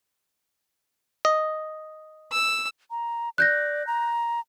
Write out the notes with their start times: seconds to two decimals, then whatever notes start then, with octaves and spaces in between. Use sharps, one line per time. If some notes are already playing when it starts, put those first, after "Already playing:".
1.25 D#5
2.32 E6
2.91 A#5
3.38 D5 F#6 G6 A#6
3.87 A#5